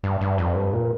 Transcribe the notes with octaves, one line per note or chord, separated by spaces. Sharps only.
G2
G2
F2
G2
A#2